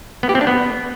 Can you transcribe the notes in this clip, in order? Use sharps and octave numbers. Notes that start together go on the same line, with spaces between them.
B3
G4
C4
D4
B3